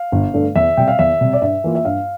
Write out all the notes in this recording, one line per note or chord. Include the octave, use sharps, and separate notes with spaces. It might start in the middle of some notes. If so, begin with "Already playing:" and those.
Already playing: F5
G1
G2 D3 A3 D4
E2 E5
C3 G3 G5
F5
E2 E5
C3 G3
D5
G2 E5
E3 A#3 F4
E5
G2 F5